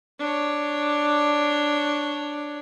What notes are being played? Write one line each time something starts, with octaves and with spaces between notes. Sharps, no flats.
D4 C#5